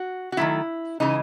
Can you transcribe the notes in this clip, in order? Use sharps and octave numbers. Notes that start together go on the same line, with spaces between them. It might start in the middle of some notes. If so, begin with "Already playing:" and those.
Already playing: F#4
F#4
D#3 F#3 A3 E4
C#3 E3 G#3 D#4